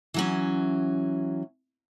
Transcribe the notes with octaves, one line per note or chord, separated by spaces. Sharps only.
E3 F#3 C#4